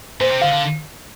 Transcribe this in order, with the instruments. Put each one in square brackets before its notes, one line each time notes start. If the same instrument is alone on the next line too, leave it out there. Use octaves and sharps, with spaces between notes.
[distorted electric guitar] A#2 [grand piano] C5
[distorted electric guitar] C3
[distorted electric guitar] D3 [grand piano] F5
[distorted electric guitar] D3